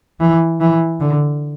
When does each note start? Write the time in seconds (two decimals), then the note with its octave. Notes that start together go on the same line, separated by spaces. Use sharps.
0.20 E3
0.60 E3
1.00 D3